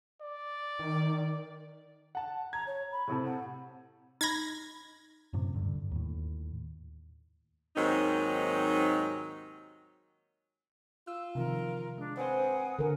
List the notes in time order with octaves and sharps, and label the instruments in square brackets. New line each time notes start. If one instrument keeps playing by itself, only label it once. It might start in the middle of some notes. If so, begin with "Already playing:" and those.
[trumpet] D5
[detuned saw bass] D#3
[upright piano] F#5 A5
[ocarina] A#5 [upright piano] G#6
[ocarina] C#5
B5
[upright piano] A2 C3 A4
[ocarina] F#5
[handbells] D#4 B5 [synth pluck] G#6 A#6
[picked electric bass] F#2 A2 C3
D#1 G2 D3
D#2 A2
[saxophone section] D#2 G#2 D#3 F#3 C4 D#4
[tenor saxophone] F4 [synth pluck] E6
[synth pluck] C3 D#3 F3 [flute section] A#4
[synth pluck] G#3 [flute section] D4
[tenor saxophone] C4 [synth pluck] B4 C5 [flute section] F#5 G#5 D#6
[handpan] D3 A#4